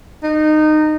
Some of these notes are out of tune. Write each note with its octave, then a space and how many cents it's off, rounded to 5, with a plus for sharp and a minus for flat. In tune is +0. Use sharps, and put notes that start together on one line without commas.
D#4 -20